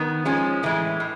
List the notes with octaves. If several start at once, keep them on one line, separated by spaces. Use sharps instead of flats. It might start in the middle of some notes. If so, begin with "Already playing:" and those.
Already playing: D#3 B3
F3 G#3 C#4
A2 E3 G#3
A2